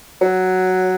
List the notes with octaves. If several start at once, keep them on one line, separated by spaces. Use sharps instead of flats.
F#3